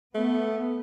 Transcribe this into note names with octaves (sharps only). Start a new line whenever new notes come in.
A3 B3